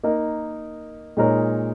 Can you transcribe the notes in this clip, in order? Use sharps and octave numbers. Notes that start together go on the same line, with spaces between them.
A#3 D#4 A#4 D#5
A#2 G#3 D#4 A#4 C#5